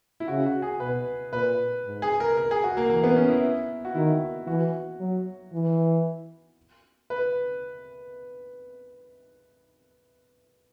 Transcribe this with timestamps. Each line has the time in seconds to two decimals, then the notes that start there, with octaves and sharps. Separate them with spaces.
0.20 E4
0.28 C#3 F#4
0.46 F#4
0.62 G#4
0.80 B2 B4
1.32 A#2 B4
1.85 G#2
2.02 G#4
2.20 A#4
2.37 A#4
2.51 G#4
2.64 F#4
2.77 A#3
2.89 E3 A#3
3.04 B3
3.16 C#4
3.29 E4
3.85 F#4
3.95 D#3 E4
4.47 E3 F#4
5.00 F#3
5.53 E3
7.10 B4